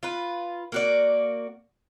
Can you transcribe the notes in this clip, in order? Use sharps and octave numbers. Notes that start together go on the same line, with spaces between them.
F4 B4
A#3 F#4 D5